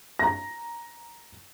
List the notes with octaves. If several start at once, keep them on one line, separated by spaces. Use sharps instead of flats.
A#5 A#6